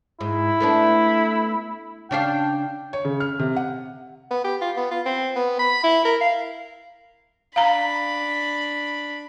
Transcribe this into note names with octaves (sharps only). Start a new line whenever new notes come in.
G#2 E4
A3 B3 D4
C#3 D4 F5 G5
C#5
C#3
F6
C3
F#5
B3
G4
F4
B3
F4
C4
B3
B5
E4
A#4
F5
D4 F5 A#5 B5